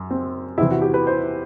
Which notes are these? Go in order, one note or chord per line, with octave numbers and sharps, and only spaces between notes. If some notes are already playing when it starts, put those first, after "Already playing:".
Already playing: F#2
C4
E2 C3 E3 E4
F#4
G4
B4
C5